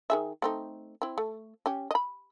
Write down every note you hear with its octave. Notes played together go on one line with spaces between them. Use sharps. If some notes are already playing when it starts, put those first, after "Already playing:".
D#3 G#4 E5
A3 C4 D#4
C4 E4
A3
C#4 G4
D#5 B5